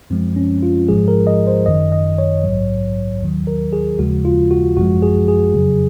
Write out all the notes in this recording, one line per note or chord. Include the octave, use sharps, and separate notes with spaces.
F#2 F3 G#3 C4
C#4
F4
G#1 G#2 F3 G#3 G#4
A#4
D#5
C5
G#1 F#2 D#3 D#5
D#5
C#5
A#1 G#2 F#3
D#2 D#3 F#3
A#4
G#4
D#2 C#3 F3 G#3 F#4
F4
F#4
G#1 F#2 F3 G#3 F#4
G#4
G#4
F2 C#3 F#3